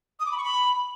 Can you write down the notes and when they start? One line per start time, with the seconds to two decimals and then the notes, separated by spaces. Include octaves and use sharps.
0.20 D#6
0.26 D6
0.32 B5
0.38 C#6
0.44 B5